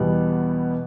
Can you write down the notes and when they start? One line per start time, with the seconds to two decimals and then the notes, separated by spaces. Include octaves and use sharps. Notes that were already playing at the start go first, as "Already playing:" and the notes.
Already playing: E2 B2 G3 B3